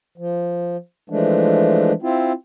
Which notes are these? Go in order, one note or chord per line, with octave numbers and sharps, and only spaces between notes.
F3
E3 F3 G#3 A3 D4
C4 E4 F4